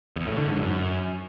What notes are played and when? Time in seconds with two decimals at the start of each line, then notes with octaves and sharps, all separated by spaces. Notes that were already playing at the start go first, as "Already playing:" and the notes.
0.16 E2
0.27 A2
0.38 D3
0.48 G#2
0.59 F#2